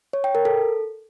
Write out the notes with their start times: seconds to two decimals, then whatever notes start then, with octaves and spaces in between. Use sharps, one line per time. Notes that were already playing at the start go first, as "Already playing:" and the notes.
0.13 C#5
0.24 G5
0.35 A#4
0.45 A4